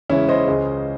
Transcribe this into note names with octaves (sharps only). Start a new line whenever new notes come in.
E2 C#3 E3 G#3 C#4 E4
C5 D#5
C#2 C#3 G#3